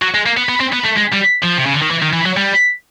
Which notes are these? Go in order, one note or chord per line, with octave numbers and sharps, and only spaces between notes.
F#3
G#3
A#3
B3
B3
C4
B3
A3
G#3
G3
F3
C3
C#3
D3
D#3
E3
D#3
E3
F#3
G3